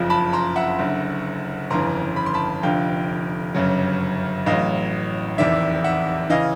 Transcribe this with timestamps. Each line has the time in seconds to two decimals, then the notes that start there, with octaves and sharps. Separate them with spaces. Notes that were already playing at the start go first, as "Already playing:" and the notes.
Already playing: F#1 F2 C#3 F3
0.10 A5 B5
0.33 A#5 C6
0.56 E5 F#5
0.79 F#1 F#2 D3
1.70 G1 F2 C#3 E3 A#5 C6
2.16 B5
2.26 C6
2.34 A5 B5
2.63 F1 F2 D3 F3 F5 G5
3.54 G1 F#2 C#3 F#3
4.46 A1 A2 F#3 D#5 F5
5.38 F1 E2 C3 D#3 D5 E5
5.84 E5 F#5
6.30 C#3 E3 D#5 F5